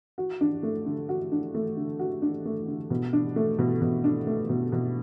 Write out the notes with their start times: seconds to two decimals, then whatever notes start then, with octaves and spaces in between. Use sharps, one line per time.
0.18 F#4
0.41 D4
0.63 A3
0.86 D3
1.09 F#4
1.32 D4
1.54 A3
1.77 D3
1.99 F#4
2.22 D4
2.45 A3
2.68 D3
2.90 B2
3.13 D4
3.36 A3
3.59 B2
3.82 B2
4.04 D4
4.27 A3
4.49 B2
4.72 B2